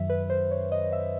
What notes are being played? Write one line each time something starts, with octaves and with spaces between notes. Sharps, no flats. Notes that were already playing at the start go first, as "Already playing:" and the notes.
Already playing: F#2 D#3 F#3 E5
B4
C5
C#5
D#5
E5